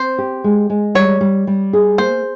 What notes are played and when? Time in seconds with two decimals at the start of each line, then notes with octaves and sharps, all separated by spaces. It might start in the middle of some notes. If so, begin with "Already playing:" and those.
Already playing: C4 C5
0.18 G4
0.44 G#3
0.70 G#3
0.95 G3 C#5
1.21 G3
1.47 G3
1.73 G#4
1.98 A#3 C5